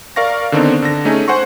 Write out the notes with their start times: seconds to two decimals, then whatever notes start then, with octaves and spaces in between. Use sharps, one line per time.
0.16 A#4 D5 F5 C#6 A#6
0.52 D3 D#3 B3 C4 D4 D#4
0.82 D3 A#6
1.05 A3 C#4 D#4 G#4
1.28 C5 F#5 G#5 C6 C#6